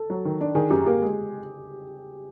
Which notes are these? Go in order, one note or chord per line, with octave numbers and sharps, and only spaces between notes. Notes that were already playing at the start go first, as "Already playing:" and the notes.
Already playing: A4
F#3
D#3
D4
D#3 G#4
F#2 G4
A#3 G4
G#3